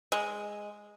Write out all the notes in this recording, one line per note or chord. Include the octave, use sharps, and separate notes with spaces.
G#3